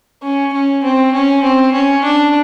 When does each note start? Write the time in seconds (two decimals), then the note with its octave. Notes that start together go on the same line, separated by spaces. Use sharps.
0.23 C#4
0.53 C#4
0.83 C4
1.13 C#4
1.43 C4
1.73 C#4
2.04 D4